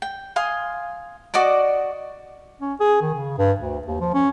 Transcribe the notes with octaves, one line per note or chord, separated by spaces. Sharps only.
G5
F5 G#5 C6 D#6
F#4 D5 D#5 D6
C#4
G#4
D#3
C#3
G2
D2
D#2
F3
C#4